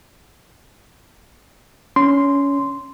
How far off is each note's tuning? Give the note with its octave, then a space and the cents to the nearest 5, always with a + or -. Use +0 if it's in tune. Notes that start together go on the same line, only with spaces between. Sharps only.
C#4 +20 C6 -10